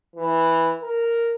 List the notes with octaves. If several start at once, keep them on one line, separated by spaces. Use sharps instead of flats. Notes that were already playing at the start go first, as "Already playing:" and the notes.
E3
A#4